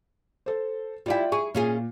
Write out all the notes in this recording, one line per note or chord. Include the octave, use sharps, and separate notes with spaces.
A4 C5
G3 E4 F4 D5 G5
G#4 C#6
A#2 C#4 F4 G#4